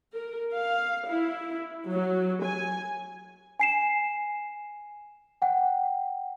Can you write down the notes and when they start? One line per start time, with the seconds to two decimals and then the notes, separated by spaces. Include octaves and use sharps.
0.12 A#4
0.55 F5
1.09 E4
1.88 F#3
2.43 G#5
3.60 G#5 C7 E7
5.42 F#5 G5